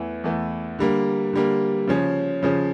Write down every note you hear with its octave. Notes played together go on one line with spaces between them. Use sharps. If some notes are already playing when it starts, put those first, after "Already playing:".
Already playing: E2 E3 A3
E2 E3 A3
D3 G3 A#3
D3 G3 A#3
C#3 F3 C#4
C#3 F3 C#4